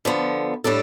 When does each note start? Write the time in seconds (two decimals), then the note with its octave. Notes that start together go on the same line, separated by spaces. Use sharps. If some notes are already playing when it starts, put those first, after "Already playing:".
0.05 D3 F3 B3
0.64 A2 G3 D4 A4